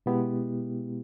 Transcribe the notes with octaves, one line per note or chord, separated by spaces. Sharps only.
B2 G#3 B3 E4 G4